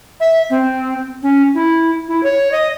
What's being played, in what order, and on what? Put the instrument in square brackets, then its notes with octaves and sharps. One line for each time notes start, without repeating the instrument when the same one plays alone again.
[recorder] E5
C4
C#4
E4
E4
C#5
D#5